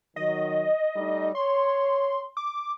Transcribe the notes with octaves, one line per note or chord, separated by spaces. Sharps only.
D#3 F#3 D#5
G3 A3 D#4
C#5 C6
D6